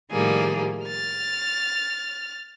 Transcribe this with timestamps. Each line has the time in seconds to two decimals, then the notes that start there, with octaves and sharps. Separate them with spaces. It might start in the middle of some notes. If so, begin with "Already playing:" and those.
0.11 A2 D#3 F3 G3 A#3 G#4
0.86 F6 A6